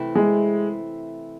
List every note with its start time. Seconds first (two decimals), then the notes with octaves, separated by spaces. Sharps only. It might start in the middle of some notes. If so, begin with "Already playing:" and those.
Already playing: C3 E3 A3 C4 E4
0.15 G#3